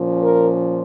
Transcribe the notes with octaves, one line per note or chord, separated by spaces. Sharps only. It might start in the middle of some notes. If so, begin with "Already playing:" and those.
Already playing: A#2 F3 C#4
A#4